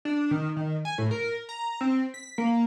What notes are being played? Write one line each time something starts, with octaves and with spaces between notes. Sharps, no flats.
D4
D#3
D#3
G#5
A2
A#4
A#5
C4
B6
A#3